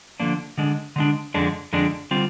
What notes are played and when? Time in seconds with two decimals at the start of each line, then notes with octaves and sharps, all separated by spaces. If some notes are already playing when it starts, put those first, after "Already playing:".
0.20 D3 F3 A#3 D4
0.58 D3 G#3 D4
0.96 D3 G#3 D4
1.34 F2 D3 G#3 D4
1.73 F2 D3 G#3 D4
2.11 D3 G3 C4 F4